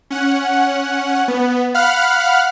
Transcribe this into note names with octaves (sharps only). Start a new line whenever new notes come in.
C#4 F#5
B3
F5 F#5 B5 F6 F#6